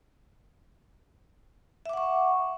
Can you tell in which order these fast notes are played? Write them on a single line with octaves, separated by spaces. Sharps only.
E5 D6 F#5 C#6